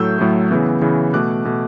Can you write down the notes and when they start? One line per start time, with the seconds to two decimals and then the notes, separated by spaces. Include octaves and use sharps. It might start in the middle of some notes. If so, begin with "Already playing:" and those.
Already playing: A2 F#3 A3 E6 G6
0.19 A2 F#3 A3
0.51 C#3 E3 B3
0.82 C#3 E3 B3
1.14 B2 A3 D6 F#6
1.45 B2 A3